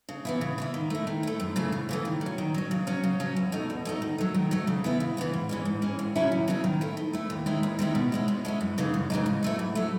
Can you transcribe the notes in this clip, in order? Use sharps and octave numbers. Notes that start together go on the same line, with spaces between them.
C#3
E3 B3 E4
C#3
E3 B3 E4
D#3
A3 E4
D#3
A3 E4
F#2
C#3 E3 A3
F#2
C#3 E3 A3
D#3
F#3
C#4
D#3
F#3 C#4
C#3
F#3 C#4
C#3
F#3 C#4
E2
B2 A3 D#4
E2
B2 A3 D#4
D#3
F#3 A3
D#3
F#3 A3
C#3
E3 B3 E4
C#3
E3 B3 E4
G#2
E3 G#3 C#4
G#2
E3 G#3 C#4
D#2
C#3 F#3 C#4 E4
D#2
C#3 F#3 C#4 E4
D#3
A3 E4
D#3
A3 E4
D#2
D#3 G#3 C#4 E4
D#2
D#3 G#3 C#4 E4
B2
G#3 C#4 E4
B2
G#3 C#4 E4
F#2
C#3 E3 G#3 D#4
F#2
C#3 E3 G#3 D#4
G#2
F#3 A3 E4
G#2
F#3 A3 E4